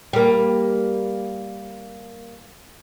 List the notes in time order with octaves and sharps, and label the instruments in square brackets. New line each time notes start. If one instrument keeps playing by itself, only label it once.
[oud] G3 A#3